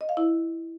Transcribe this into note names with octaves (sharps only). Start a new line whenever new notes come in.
D#5
F5
E4